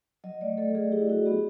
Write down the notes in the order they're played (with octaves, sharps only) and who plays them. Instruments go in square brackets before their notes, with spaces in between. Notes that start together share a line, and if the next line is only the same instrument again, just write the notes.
[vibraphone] F#3 D#5
A3 D5
A3 A4
A3 G#4
E4 G4
E4 F#4
B3 G4